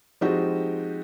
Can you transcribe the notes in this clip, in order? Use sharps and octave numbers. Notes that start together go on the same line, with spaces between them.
F3 G#3 C4 D#4 F#4 G4